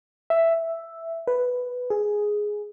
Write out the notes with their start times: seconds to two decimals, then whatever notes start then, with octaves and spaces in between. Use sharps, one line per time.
0.30 E5
1.27 B4
1.90 G#4